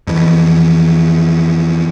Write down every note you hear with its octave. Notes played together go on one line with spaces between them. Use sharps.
F2 E3